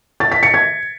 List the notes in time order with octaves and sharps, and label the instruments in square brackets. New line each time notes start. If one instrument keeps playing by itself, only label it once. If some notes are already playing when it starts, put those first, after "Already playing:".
[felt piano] A6
B6
C#7
G#6